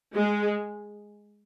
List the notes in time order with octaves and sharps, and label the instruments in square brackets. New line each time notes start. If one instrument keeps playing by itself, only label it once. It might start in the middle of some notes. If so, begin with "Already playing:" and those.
[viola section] G#3